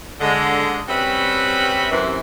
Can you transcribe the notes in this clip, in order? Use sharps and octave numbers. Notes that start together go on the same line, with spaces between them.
D3 G#3
G3 C4 C#4 F#4 B4 E5
F#2 C3 E3